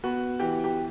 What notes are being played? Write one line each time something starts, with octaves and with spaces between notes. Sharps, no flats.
B3 F#4
E3 G4
G4